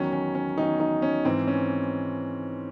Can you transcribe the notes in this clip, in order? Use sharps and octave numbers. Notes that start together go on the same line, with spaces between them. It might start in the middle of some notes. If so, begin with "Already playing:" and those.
Already playing: E2 D#3 F#3 C#4
C#4
C#4
E2 D#3 F#3 D#4
D#4
C#4
G#2 E3 C4
C#4